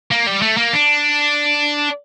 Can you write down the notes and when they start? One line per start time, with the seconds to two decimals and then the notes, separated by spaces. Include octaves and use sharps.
0.11 A#3
0.26 G3
0.42 A3
0.57 A#3
0.73 D4